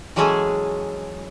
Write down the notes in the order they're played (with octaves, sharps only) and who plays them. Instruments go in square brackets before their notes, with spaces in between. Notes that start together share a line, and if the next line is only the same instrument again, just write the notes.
[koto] E3 F#3 G#3 C#4 G#4 A4